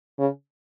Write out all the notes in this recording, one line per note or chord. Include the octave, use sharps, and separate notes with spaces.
C#3